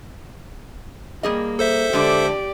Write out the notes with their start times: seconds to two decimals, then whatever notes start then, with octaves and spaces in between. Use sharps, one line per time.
1.23 G3 A#3 G#4 D#5
1.59 A4 C5 E5
1.93 D3 G#3 G4 D5